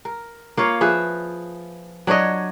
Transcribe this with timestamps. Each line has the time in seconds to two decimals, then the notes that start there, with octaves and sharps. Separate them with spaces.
0.05 A#4
0.57 A#3 F4 C#5 F5
0.81 F3 G#4 B4 E5
2.07 F#3 D4 C#5 D#5